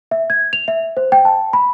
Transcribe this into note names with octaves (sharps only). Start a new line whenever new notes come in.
E5
G#6
F7
E5
C5
G5
A5
B5